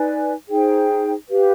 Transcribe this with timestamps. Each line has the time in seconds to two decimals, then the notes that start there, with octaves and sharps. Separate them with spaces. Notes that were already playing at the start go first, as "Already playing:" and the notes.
Already playing: D#4 B4 D5 G#5
0.49 D#4 G#4 C5 G5
1.29 G4 B4 F5